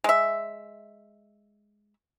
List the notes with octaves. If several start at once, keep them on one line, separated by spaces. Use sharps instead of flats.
G#3 E5